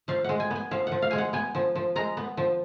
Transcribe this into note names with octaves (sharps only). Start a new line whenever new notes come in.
F3 F5
G#3 F#5
G#5
B3 G#5
F3 F5
F3 F#5
F5
G#3 G#5
F#5
B3 G#5
F3
F3
G#3 A#5
B3
F3